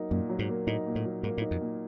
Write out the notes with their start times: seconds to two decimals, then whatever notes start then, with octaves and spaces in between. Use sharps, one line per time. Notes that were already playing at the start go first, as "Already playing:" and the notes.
Already playing: F#3 A#3 D#4
0.11 F#2 A#2
0.29 F#3
0.39 G#2
0.49 A#3
0.67 A2 D#4
0.86 A#2
0.95 A2
1.05 F#3
1.23 G#2 A#3
1.38 A2
1.42 D#4
1.51 F2
1.61 A#2